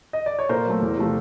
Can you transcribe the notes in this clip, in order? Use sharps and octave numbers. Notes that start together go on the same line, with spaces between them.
D#5
D5
C#5
A#2 A#4 C5
F#3 A3
E2
C3 F3 A3